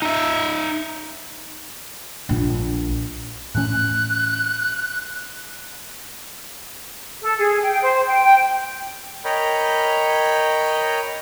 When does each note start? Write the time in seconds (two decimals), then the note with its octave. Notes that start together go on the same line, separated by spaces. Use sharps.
0.02 D#4 E5
2.29 A#1
3.55 A2 E3 C#4 F#6
7.22 A4
7.39 G#4
7.62 G5
7.82 C5
8.07 G5
8.24 G5
9.24 A#4 C#5 D#5 G5 B5